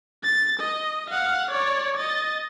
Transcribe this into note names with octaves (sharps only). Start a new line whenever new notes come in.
A6
D#5
F5 F#5
C#5 D5
D#5 A6